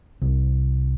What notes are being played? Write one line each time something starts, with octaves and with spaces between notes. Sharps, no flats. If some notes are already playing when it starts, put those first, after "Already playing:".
C2